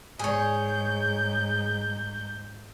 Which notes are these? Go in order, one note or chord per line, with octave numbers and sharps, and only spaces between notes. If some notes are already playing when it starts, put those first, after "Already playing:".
G#2 G#4 C#5 G6